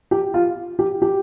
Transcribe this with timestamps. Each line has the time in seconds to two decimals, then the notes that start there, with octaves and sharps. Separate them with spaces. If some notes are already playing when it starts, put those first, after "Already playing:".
0.11 G4
0.34 F4
0.79 G4
1.02 G4